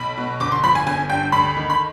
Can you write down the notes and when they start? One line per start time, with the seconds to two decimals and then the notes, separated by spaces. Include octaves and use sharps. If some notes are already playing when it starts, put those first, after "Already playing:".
Already playing: B1 B5
0.18 B2
0.40 G1 D6
0.52 C6
0.63 F3 B5
0.75 G#5
0.87 G1 G#5
1.10 G2 G5
1.32 D2 B5
1.57 D#3
1.70 B5